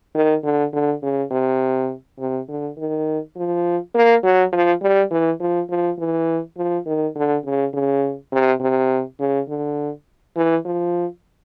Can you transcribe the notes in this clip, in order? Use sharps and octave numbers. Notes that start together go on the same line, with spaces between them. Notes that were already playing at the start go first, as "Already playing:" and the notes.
D#3
D3
D3
C#3
C3
C3
D3
D#3
F3
A#3
F#3
F3
G3
E3
F3
F3
E3
F3
D#3
D3
C#3
C#3
C3
C3
C#3
D3
E3
F3